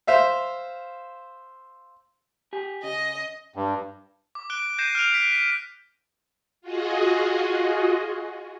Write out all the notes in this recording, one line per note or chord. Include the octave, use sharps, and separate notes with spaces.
C5 E5 F5
G4 G#5
C#3 D#5
G2
D6
F#6 D7 G7
G6 A#6 C7 D#7 E7
F6 F#6 D7 F7
B6 D7
B6
F4 F#4 G#4 D#5